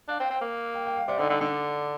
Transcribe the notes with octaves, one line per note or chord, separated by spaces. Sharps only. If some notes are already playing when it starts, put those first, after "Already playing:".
D4 F5
C4
C4
A#3
G5
G5
F5
C3 D5
D3 D#4
D3 D#4
D3 D4